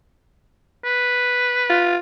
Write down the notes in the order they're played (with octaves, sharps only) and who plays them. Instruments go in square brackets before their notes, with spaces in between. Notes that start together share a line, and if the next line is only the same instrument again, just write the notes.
[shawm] B4
[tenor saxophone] F4